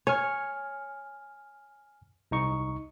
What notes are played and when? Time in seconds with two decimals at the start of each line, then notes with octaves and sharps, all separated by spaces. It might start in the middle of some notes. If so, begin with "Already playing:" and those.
0.07 C#5 G#5 F6
2.31 C2 D#4 C#6